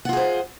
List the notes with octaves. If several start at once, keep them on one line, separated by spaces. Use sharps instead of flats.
F4 G#4 C5 F#5